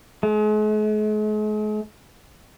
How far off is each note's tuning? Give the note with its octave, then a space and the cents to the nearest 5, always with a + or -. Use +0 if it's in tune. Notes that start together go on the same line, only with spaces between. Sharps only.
G#3 +45